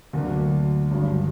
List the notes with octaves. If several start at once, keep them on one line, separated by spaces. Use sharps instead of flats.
D2 D3 F#3 A#3
G#1 G2 D3 F#3